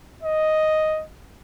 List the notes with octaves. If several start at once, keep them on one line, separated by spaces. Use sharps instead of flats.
D#5